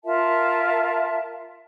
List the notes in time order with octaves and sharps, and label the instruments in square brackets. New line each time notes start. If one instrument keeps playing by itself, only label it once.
[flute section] F4 A#4 E5 A5